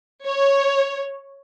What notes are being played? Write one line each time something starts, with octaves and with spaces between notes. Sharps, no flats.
C#5